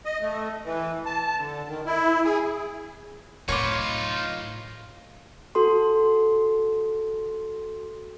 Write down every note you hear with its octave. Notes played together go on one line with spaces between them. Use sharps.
D#5
A3
E3
A5
D3
D#3
E4
G#4
A2 D#4 F4 B4 C#5 C6 D6
F#4 A4 C6